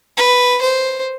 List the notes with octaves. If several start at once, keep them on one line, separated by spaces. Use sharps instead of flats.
B4
C5